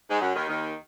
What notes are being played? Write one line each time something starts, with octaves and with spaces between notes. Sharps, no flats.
G#2 G#3
F#2 F#3
D#2 D#3
D#2 D#3